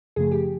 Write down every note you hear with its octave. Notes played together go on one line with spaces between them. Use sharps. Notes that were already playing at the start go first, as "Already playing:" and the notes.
F#2 C#3 F3 A3 G#4
G4